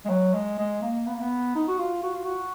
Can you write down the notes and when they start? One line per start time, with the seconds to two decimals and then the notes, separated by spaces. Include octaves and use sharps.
0.05 G#3
0.09 F#3
0.33 G#3
0.58 G#3
0.82 A#3
1.06 B3
1.13 A#3
1.20 B3
1.55 D#4
1.67 F#4
1.79 F4
2.03 F#4
2.13 F4
2.25 F#4